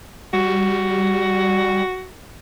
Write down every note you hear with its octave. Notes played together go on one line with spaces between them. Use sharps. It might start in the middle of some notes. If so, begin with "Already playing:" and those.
G3 F#4